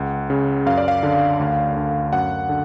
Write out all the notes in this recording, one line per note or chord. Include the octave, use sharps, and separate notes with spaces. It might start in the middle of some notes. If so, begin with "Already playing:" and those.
Already playing: C#2 F#5
C#3
F#2 F5
D5
F5
D3
D2
D3
F#2 F#5
D3